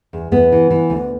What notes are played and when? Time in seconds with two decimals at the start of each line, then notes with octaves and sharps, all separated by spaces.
0.13 E2
0.32 E2 B3
0.52 E3
0.70 E3
0.90 D2